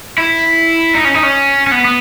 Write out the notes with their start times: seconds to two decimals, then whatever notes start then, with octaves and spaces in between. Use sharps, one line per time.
0.18 E4
0.95 D#4
1.05 C#4
1.14 D#4
1.23 C#4
1.67 C#4
1.71 B3
1.85 B3